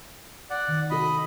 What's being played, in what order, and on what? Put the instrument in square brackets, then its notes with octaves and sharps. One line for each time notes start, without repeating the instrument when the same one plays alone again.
[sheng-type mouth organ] D5 F#5
[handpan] D#3
[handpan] C3 F#4 A4 [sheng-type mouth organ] D#5 B5